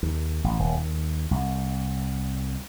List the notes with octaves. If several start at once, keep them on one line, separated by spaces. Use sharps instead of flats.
D#2
A1
D#1
D#2
C2